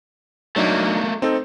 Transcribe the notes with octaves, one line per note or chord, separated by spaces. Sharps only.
F#3 A3 A#3 D4 D#4
C4 D#4 A4